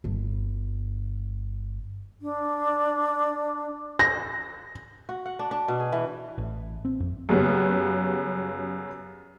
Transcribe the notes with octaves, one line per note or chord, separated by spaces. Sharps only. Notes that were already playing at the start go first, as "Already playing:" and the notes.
G1 G2
D4
A#6
F#4
F#5
D4
D4
B2
G#4
E3
A1
C4
F2
F#2 C#3 F#3 G3 B3